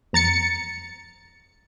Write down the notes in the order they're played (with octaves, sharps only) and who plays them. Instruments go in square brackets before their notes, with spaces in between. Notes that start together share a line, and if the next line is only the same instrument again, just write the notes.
[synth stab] F2 A#5 A6 C#7